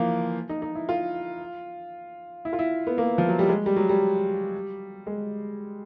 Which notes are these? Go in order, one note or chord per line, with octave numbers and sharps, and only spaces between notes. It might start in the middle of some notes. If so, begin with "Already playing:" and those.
Already playing: E3 F3 A#3
D#4
D#4
E4
F4
E4
F4
E4
B3
A#3
F3
F#3
G3
G#3
G3
F#3
G3
G#3